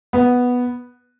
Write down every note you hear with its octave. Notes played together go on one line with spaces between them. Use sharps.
B3